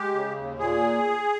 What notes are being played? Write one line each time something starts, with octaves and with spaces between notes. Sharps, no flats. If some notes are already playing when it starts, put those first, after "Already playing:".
Already playing: G#3 G4
C#3
D#2
A#2 G#4